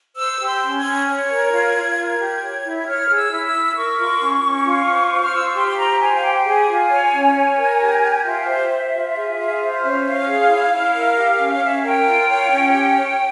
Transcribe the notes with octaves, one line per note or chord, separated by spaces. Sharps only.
C5 E6
G4
C6
C#4
G#6
C#4
C#5 G#6
A#4
F4
F4
A#4
G4
C#5
E4
C#5 F6
G#4
E6
E4
E6
E4
E6
A#4 C#6
F4
C#4
C#4
F4
C5
C5
F6
F4 E6
C#6
G4 C6
C6
C5 A#5
C5 G#5
F5
G4 G5
G#4 G#5
F4
C#5
C#4
C#5
A#4
G4
G4
F4 E5
C5
C5
F4
G#4
F4
C5
C#4
C#5 F5
G#4
E4
E4
A#4
G4
C#4
C#5
C#4 E5
F5
A#4 G5
F4
C#5
C#4
G4
C#5